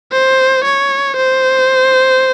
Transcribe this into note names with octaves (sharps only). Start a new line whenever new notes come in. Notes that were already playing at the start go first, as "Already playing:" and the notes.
C5
C#5
C5